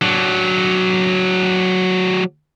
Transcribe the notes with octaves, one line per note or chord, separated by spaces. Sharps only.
F#3 D4